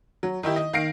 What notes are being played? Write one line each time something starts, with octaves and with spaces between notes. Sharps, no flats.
F#3
D#3 D#4 E4 G4
D#5
D#3 F5 A#6 C7 D7